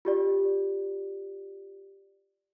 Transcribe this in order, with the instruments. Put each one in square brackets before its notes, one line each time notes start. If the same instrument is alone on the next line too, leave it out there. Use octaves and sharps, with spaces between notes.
[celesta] F4 G4 D5